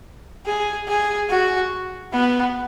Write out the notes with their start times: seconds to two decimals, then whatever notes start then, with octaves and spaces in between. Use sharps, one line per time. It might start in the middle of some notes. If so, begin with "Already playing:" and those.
0.46 G#4
0.88 G#4
1.29 F#4
2.12 B3